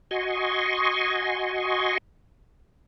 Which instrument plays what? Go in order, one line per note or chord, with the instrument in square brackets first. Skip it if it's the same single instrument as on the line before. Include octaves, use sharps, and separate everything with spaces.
[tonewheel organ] F#4 D#5 G#5 C6 C#6